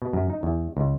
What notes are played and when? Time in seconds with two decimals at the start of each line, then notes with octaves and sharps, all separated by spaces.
0.02 B2
0.13 F#2
0.30 D#4
0.43 E2
0.77 C#2